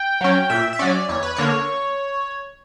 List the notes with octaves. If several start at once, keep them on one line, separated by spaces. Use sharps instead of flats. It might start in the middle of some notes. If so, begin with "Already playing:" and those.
Already playing: G5
F#3 C#4
A#2 E5
E5
F#3 C#4 D5
E2 C#5
B4
D3 A#3 C#5